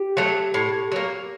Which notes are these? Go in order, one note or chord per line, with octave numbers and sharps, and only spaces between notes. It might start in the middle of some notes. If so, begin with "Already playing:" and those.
Already playing: G4
F#3 A3
A2
F#3 A#3